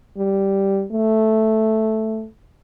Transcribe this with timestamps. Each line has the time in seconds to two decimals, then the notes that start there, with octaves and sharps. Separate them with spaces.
0.17 G3
0.92 A3